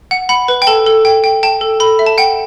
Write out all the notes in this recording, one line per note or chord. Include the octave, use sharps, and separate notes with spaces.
F#5
F#5 B5
B4
G5
A4 A5
A4
G5
G5
G5 A5
A4
A4 B5
E5
A5
F#5 G5